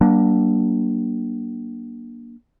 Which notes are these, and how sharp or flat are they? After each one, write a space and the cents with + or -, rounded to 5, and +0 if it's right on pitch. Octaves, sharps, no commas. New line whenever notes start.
F#3 +45 A#3 +20 D4 +0